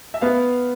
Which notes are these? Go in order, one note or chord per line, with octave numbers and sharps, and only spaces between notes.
E5
B3 F5